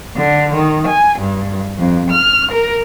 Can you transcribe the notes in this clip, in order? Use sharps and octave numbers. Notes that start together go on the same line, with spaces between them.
D3
D#3
G#5
G2
F2
F6
A#4